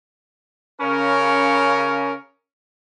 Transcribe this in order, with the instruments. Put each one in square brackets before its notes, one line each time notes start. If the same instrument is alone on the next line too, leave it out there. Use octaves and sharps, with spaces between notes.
[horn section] C#3 C#4 A#4